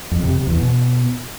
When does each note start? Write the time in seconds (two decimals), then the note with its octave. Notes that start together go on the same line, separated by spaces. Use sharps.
0.11 F2
0.23 C3
0.35 C3
0.47 E2
0.59 B2